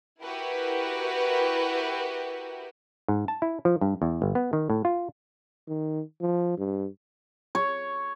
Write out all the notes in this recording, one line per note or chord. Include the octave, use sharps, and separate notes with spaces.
E4 F#4 G4 A#4 B4
G#2
A5
E4
F3
G2
E2
G1
B3
D#3
A2
F4
D#3
F3
G2
C#5